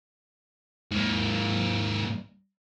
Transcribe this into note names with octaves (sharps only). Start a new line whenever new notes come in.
G#2 A#3